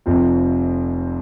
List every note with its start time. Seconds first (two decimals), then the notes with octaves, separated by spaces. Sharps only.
0.06 F1 F2 C3 F3 C4